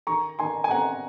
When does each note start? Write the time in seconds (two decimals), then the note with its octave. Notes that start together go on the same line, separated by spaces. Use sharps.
0.07 D#3 A#5 C#6
0.39 D#3 G#5 C6
0.64 G#5
0.71 C4 F#5 A#5